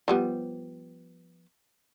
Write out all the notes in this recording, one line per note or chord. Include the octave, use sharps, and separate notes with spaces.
F3 G3 B3